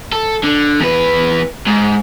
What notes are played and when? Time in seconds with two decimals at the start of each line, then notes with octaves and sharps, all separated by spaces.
0.12 A4
0.44 D3
0.80 E2 B4
1.66 G#2